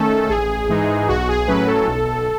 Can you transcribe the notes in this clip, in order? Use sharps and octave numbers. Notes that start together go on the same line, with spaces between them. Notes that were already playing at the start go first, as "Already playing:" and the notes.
Already playing: D#3 A3 C#4 A4
A1 G#4
G#2 E3 G#3 D#4
B1 F#4
G#4
A2 F#3 C#4 B4
A4
B1